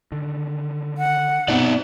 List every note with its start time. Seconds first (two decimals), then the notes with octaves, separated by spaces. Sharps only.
0.12 D3 D#3
0.98 F#5
1.48 B2 B3 C4 D#4 D5